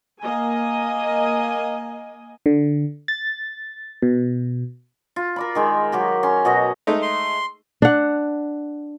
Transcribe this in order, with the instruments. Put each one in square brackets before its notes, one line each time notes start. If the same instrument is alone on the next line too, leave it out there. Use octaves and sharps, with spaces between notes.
[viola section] A#3 D#5 G#5
[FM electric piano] D3
A6
B2
[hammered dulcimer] F4
A#4 D5 B5
D#3 G#3 G5
F#3 G4 A#4
C#4 C6
B2 F#4 D#5 A#5
[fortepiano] G#3 A3 D#4
[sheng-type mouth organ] C6
[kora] D4 F#5